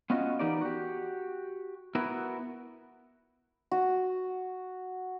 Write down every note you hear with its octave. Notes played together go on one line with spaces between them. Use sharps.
B3 C#4 F4 F#4 D#5
E3 B3 D#4 G4 A#4 D5
F#4 G4
B3 E4 F#4 A#4
F#4